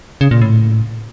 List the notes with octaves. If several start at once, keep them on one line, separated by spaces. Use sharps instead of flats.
C#3
A#2
A2